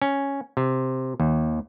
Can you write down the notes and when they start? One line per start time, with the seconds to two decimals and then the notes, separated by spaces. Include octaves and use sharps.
0.02 C#4
0.57 C3
1.20 D#2